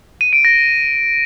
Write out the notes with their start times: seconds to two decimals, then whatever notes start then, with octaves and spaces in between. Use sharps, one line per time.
0.21 D#7
0.33 D7
0.45 A#6